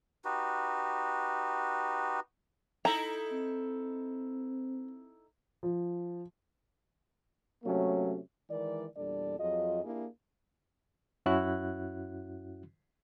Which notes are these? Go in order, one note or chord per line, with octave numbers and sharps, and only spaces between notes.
D#4 F#4 G4 B4
D#4 E4 A4 A#5
C4
F3
C3 F#3 A3 A#3 C#4
D#3 E3 G#3 A#4 D5
E2 A#2 G3 D4 A4 D5
F2 F#3 F4 G#4 D#5
A#3 D4 E4 G4 G#4
F#2 C#4 E4 F#4 F#6